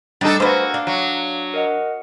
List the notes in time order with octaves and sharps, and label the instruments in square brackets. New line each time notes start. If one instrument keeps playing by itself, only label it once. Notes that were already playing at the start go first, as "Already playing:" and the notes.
[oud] G3 [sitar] D4 D#4 A4 [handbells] A6
[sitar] A#3 F#4 [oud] B4 C5 [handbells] G#5 E6 F6
[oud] D4 [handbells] F5
[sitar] F#3
[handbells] A#4 D#5 F#5